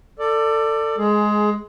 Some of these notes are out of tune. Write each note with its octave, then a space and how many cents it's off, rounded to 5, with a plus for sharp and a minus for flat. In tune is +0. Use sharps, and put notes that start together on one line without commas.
A4 +25 D5 +10
G#3 +10 G#4 +20